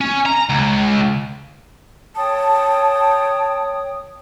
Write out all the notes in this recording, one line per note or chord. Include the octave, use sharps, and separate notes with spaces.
C#4
A#5
C#2
C#5 G5 A5 D#6